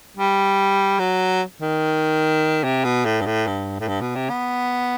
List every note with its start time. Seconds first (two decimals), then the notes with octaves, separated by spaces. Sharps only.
0.17 G3
0.99 F#3
1.61 D#3
2.64 C3
2.84 B2
3.05 A2
3.21 G2
3.26 A2
3.47 G2
3.80 A2
3.88 G2
4.01 B2
4.15 C3
4.29 B3